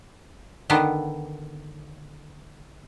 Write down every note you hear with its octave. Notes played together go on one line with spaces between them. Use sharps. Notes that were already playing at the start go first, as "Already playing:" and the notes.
D3 D#3 B3